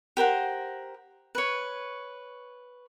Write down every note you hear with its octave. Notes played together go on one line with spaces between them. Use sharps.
G4 A#4 C5 F#5
B4 C#5